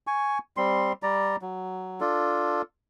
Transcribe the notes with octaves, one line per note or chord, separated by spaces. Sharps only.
G#5 C#6
G3 C4 C6
G3 D5 A#5
F#3
D4 F4 A4